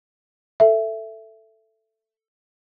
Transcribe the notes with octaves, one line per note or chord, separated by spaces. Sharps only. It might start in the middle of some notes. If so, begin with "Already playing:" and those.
A4 E5